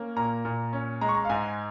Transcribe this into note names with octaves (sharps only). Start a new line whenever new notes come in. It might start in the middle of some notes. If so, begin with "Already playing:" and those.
Already playing: A#3 C#4
A#2 A#5
A#2
C#4
G#3 A#5
C#6
A#5
F5
G#2 G#5